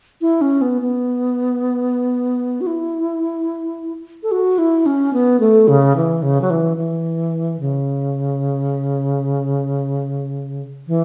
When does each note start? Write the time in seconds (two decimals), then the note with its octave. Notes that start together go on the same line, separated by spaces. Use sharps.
0.21 E4
0.41 C#4
0.62 B3
0.82 B3
2.61 F#4
2.67 E4
4.23 A4
4.31 F#4
4.58 E4
4.86 C#4
5.13 B3
5.40 A3
5.68 C#3
5.96 E3
6.22 C#3
6.41 F#3
6.50 E3
6.77 E3
7.60 C#3
10.87 E3